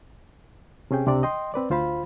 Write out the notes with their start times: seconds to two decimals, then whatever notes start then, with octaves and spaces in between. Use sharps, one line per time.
0.91 C3 C#4 G#4 G5
1.07 C#2 C3 C4 D4 D5
1.23 D#5 G5 C6
1.54 C4 B4 D5
1.70 D2 F4 C5 F5 B5